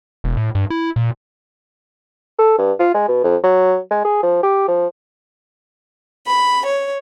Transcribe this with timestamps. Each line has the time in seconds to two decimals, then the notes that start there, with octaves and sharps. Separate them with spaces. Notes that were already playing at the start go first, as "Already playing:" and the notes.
0.24 E1
0.37 A2
0.55 G2
0.70 E4
0.96 A#2
2.38 A4
2.58 G2
2.79 F4
2.94 G#3
3.08 B2
3.24 F2
3.44 F#3
3.91 G#3
4.05 G#4
4.23 F3
4.43 G4
4.68 F3
6.26 B5
6.67 C#5